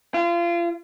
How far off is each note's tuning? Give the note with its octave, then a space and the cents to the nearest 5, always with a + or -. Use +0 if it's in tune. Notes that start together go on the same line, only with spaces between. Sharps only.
F4 -30